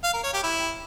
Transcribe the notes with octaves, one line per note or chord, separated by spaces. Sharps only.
F5
A#4
C#5
G4
E4